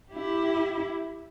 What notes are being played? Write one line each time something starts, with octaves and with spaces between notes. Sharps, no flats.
E4 G4